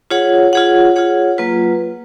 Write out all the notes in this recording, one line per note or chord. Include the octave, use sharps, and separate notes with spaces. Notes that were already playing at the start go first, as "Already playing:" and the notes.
F4 G#4 C#5 F#5
F4 G#4 C#5 F#5
F4 G#4 C#5 F#5
F#3 A#3 F4 B4